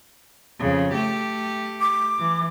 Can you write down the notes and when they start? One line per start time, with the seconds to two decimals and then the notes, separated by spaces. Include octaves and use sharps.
0.59 F2 C#3
0.94 A3 G4
1.81 D6
2.19 E3